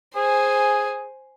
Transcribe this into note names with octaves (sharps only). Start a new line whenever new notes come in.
G#4 C5 G#5